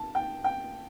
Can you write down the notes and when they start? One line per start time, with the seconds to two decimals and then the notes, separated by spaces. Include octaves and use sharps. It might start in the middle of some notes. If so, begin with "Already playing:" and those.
Already playing: A5
0.15 G5
0.44 G5